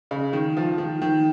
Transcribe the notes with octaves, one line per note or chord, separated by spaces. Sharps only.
C#3
D#3
F3
D#3
D#3